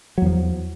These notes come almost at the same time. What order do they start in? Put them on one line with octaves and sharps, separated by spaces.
F#3 E2 F3